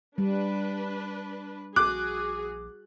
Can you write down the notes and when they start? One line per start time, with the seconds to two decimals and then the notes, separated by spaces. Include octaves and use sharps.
0.18 G3 D4 B4
1.76 A#1 F#4 G#4 D6 F#6